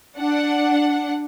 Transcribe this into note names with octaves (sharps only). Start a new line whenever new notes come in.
D4 F#5